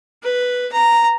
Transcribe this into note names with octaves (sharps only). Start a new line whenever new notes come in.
B4
A#5